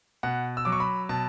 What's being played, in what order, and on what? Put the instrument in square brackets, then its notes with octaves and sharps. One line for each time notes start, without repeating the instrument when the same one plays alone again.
[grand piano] B2 F#5
E6
F#3 D6
C#6
B5
B2 A5